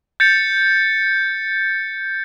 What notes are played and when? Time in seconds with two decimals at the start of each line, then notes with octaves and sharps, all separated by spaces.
0.20 G6 A6 C#7